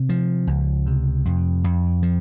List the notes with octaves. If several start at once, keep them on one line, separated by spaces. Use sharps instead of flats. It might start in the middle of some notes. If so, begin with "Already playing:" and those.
Already playing: C3
F3
C#2
C3
F2
F2
F3